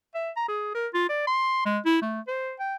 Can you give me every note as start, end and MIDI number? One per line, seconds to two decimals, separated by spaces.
0.14 0.30 76
0.36 0.45 82
0.48 0.70 68
0.74 0.87 70
0.94 1.09 65
1.09 1.23 74
1.27 1.64 84
1.66 1.79 56
1.85 2.01 64
2.02 2.20 57
2.28 2.53 72
2.59 2.76 79